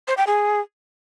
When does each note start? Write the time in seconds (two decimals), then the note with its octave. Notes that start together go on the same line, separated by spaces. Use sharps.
0.08 C5
0.17 G5
0.27 G#4